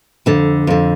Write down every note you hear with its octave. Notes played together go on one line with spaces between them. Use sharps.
F2 D3
F2 D3